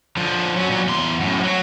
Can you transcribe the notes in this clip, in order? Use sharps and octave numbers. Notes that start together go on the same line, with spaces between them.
D3 F3
F#3 C#4
A#2 F#3
E2 C6
F#2 A2
F3 F#3